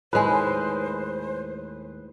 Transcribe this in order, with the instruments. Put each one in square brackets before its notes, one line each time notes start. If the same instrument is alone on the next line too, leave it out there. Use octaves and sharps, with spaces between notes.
[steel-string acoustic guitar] D#2 G#5 [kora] A2 G#3 [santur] B4 [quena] C5